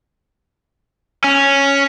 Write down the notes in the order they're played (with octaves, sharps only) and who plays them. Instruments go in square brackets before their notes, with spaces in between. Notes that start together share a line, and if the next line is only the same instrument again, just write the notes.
[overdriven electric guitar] C#4